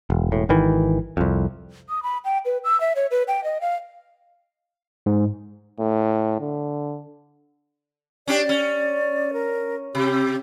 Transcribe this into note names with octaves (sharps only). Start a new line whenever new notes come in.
E1
E1 A2
G#1 D#3 E3
C2 F2
D#6
B5
G5
B4
E6
E5
C#5
B4
G5
D#5
F5
G#2
A2
D3
C#4 D4 G4 D5
C#4
A#4
C3 G4